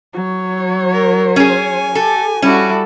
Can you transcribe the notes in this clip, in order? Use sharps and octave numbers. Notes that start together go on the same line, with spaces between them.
F#3 C#5
A#4
C#4 G#4 G#5
G4 A4
G3 C#4 E4 F#4 A4